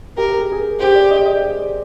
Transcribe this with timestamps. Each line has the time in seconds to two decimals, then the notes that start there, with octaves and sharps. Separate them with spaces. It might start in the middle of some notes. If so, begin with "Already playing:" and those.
0.17 G4 A#4
0.38 G#4
0.52 G#4
0.59 A#4
0.79 G4 C5
0.95 D5
1.11 D#5
1.19 D5
1.26 D#5